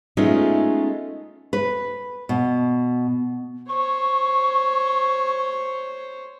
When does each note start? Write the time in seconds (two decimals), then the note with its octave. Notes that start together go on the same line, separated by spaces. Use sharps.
0.17 G#3 A3 B3 C#4 D#4 F4
1.53 B4
2.29 B2
3.69 C5 C#5 C#6